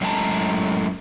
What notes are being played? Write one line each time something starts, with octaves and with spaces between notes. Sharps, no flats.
F#2 A2 G#3 G5 A5 A#5